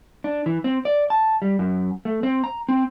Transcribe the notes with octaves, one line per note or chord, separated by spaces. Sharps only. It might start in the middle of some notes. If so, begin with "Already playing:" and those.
D4
E3
C4
D5
A5
G3
F#2
A3
C4
A#5
C4